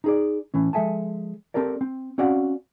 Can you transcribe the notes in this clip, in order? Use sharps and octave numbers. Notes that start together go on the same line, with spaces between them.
D#4 G#4 D5
A2 E3 C#4
F3 G#3 A4 E5 G#5 A5
C4 G4 A4 A#4 D5
C4
C4 C#4 F#4 D5 F5 F#5